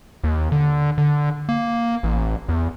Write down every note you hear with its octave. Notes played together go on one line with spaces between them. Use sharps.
D#2
D3
D3
A#3
A1
E2